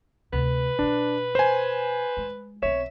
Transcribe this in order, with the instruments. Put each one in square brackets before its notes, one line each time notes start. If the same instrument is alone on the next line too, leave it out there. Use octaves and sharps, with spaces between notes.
[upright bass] D2 C3 [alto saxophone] B4
[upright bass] B2 D#4 [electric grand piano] D4
[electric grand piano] C5 G#5
[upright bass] G#3
[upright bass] B1 C4 [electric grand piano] C#5 [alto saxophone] E5